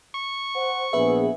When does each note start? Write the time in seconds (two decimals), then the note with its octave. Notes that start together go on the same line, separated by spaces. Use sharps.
0.14 C#6
0.55 C5 F#5
0.93 A#1 B3 G#4 B4 E5